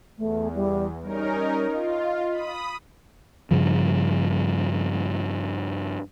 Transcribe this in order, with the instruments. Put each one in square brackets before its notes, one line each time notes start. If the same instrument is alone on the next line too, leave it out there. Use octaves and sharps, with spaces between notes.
[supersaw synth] E2 [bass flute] A3
[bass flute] G3
[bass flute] G3 [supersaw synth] C#4 D#4 A#4
[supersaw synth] F4 [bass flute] D#5
[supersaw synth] B5 D#6
[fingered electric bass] G2 C#3 F3